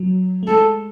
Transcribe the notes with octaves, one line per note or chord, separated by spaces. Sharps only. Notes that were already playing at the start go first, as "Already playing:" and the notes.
Already playing: F#3
A3
G#3 A4